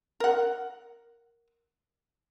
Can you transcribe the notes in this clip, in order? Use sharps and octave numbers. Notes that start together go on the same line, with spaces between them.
A#4 F#5